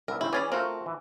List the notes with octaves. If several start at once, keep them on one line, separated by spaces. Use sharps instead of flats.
C2 B3 A#4 E5
D#2 C#3 C4 E4
E3 C#4 G#4 D5 G#5 B5
A3 C4 F4 F#4 A#4
E3